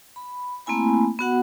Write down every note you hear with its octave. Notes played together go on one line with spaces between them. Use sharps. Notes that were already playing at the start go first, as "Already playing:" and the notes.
B5
A3 A#3 C4 E4 G#5 B5
B3 F#4 F#5